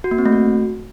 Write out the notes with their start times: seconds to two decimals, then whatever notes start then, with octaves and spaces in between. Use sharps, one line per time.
0.04 F#4
0.11 A#3
0.18 C4
0.26 A3
0.33 F#4